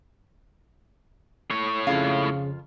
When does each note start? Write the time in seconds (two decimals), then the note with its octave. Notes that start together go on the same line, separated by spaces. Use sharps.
1.50 A2 C#5
1.87 F2 C#3 F4 F5